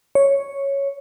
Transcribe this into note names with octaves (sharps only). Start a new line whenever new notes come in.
C#5